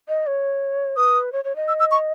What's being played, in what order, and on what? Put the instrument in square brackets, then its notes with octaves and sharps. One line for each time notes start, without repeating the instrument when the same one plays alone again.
[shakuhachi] D#5
C#5
[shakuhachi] B4 [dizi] D#6
[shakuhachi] C#5
C#5
D#5
[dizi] E6
E6
C#6